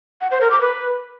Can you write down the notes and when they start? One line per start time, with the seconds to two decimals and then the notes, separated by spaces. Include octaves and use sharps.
0.21 F#5
0.31 C5
0.41 A#4
0.51 D6
0.61 B4